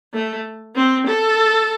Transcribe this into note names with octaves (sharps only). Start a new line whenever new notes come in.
A3
C4
A4